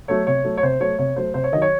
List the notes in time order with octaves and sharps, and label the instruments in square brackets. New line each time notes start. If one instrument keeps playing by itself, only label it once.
[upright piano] F#3 A3 C#5
C3 C#5
F#3 A3
C#5
C3 C5
F#3 A3 C#5
C3 C#5
F#3 A3 C5
C3 C5
C#5
D#3 D#5
F#3
C#5